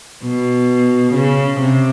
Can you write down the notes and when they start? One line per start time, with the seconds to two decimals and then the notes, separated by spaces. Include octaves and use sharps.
0.23 B2
1.15 C#3
1.61 C3